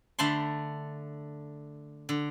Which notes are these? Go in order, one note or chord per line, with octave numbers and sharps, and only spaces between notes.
D3 A3 A5 B5 C6
D3